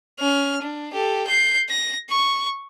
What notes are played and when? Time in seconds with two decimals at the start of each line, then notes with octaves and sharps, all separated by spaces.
0.19 C#4 F6
0.62 D4
0.93 G4 A4
1.27 G6 C7
1.69 A#6
2.10 C#6